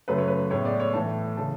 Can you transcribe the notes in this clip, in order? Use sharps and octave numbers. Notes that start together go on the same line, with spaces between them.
F#2 C#3 F#3 A3 B4
C#5
B4
A2 G#3 B3 C#5
D5
C#5
A2 E3 A3 A5
C#3 E3 A5